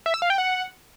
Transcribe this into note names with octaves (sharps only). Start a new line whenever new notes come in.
E5
E6
F5
G5
F#5